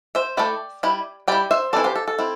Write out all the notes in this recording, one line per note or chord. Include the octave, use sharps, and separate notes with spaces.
C5 E5
A3 E4 D5 G5
G3 E4
G3 E4 D5 G5
C5 E5
E3 C4 E4 A4 D5
G4 C5
A4
A4
C4 E4